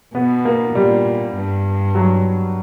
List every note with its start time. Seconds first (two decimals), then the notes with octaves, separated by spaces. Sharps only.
0.15 B2 B3
0.45 A#3
0.75 A#2 G3
1.35 G2
1.95 F#3